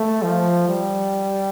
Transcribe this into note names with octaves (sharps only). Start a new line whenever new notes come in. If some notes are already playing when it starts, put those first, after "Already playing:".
Already playing: A3
F3
G3